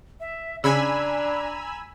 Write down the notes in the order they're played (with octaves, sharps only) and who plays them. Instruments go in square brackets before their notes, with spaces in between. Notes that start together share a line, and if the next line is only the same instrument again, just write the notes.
[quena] E5
[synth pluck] C#3 [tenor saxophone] D4 [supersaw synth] G#5 B5 E6 [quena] A#5